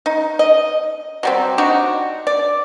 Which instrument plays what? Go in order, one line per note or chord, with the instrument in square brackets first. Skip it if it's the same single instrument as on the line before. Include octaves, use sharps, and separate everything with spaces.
[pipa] D#4
D#5
F#3 G3 C4
D4 D#4 F#4
D5